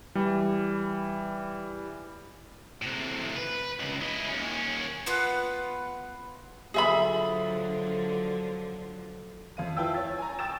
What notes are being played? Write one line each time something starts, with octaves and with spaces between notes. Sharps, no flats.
E3 G3
A2 C3
B4
C#2
E4 D#5
D#2 C#4
B3 F4 B4 F#5
D3 F3 F#3 G#4 E5 B5
F2 F5 D#7
E4 F4 B4 G5 A5 E6
C#5 A6
G#5 A#5
G5 C#6 D#6 E6 A6 E7